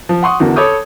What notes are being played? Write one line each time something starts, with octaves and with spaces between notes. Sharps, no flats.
F3
F#5 C6 C#6 D#6
E2 D3 F#4 A#4
A4 C#5 B5 D6 D#6 G6